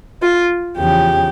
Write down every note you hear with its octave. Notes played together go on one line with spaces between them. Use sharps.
F4
E2 C#3 F3 G4